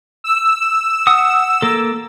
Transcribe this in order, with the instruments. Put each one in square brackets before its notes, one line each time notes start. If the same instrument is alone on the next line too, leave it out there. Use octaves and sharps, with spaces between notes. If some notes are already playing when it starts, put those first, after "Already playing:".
[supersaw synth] E6
[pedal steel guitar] F#5 D#6
A#3 A4